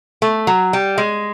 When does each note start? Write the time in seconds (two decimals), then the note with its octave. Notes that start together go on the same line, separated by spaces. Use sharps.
0.22 A3
0.47 F#3
0.73 G3
0.98 G#3